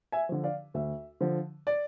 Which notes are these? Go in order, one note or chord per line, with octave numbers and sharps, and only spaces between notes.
E5 G#5
D3 F3
D5 F5
D2 E5
D3 F3
D5